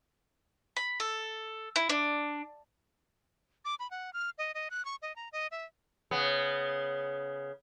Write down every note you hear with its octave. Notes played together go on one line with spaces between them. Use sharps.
B5
A4
E4
D4
D6
B5
F#5
F6
D#5
D#5
F#6
C#6
D#5
A#5
D#5
E5
C#3 B3